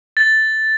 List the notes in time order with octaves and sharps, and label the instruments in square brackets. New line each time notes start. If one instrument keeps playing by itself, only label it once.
[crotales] A6